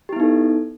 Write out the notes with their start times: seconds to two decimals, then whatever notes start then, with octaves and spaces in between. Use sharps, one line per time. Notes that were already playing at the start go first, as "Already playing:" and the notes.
0.09 G4
0.13 E4
0.16 B3
0.20 D#4
0.23 A4